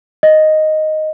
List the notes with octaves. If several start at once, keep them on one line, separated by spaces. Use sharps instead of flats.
D#5